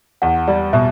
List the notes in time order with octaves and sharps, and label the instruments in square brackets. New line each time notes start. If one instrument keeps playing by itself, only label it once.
[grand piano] E2 [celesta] F#5
[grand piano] G3 [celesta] D5
[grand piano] B2 [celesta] E5